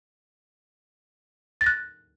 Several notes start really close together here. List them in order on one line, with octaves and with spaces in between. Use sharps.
A6 A#6 F#6